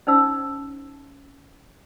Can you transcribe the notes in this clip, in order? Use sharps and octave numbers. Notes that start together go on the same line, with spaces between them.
C#4 D#4 C5 E6